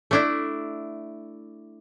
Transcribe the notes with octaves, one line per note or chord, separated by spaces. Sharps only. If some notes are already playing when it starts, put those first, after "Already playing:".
A3 D4 E4